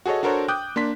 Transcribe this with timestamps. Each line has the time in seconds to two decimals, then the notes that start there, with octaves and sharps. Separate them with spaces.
0.06 F#4 G#4 A4 C#5 D#5
0.23 D4 F#4 A4 A#4 C5 C#5
0.48 G5 D6 D#6 F#6 G6
0.76 A#3 D4 C6 B6